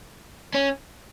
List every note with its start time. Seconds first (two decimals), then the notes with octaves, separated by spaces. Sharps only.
0.55 C#4